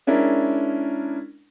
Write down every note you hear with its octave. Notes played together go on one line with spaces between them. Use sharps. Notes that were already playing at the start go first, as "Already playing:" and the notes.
G#3 C#4 D4 E4 A#4